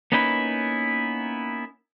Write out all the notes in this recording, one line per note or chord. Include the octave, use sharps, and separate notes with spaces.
A#3 B3 C#4 D#4 E4 B4